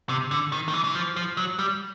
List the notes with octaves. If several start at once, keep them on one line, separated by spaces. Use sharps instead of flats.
C3
D3
D#3
D#3
E3
E3
F3
F3
F#3
G3